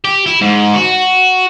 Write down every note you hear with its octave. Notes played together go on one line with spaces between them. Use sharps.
G4
E4
G#2
F#4